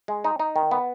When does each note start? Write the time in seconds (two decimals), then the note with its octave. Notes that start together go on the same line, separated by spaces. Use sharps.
0.08 G#3
0.24 D#4
0.39 D#4
0.56 D#3
0.71 B3